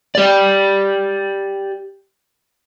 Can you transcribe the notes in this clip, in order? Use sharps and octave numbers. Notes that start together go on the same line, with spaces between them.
G4 D5